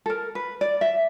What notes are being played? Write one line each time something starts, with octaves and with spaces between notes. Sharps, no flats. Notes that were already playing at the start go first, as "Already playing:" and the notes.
A4
A#4
B4
D5
E5